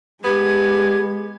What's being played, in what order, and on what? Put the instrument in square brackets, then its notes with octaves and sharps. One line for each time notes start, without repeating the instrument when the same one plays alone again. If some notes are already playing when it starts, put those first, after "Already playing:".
[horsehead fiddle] G#3 [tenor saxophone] B3 [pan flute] G4 [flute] G#6